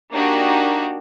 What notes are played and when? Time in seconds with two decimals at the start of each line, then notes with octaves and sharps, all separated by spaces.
0.11 A#3 D4 D#4 F#4 G4